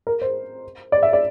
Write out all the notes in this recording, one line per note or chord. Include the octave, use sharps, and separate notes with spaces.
A#4
C5
D5
E5
D5